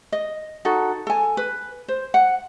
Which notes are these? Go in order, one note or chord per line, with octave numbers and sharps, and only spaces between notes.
D#5
D#4 F#4 A4
A4 G#5
B4
C5
F#5